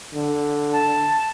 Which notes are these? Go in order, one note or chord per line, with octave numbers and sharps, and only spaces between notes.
D3
A5